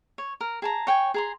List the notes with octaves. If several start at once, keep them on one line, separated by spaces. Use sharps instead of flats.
C#5
A#4
G#4 A5 A#5
C#5 G5 G#5
G#4 A#5 C6